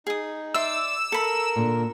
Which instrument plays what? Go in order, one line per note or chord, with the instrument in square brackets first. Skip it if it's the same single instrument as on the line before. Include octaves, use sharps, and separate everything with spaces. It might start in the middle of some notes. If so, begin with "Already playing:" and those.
[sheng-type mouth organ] D#4 [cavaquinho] G#4 D#6
[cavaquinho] D5 E5 C6 [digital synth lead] E6
[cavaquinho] A4 B5 [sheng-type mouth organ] A#4
[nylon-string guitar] A#2 D3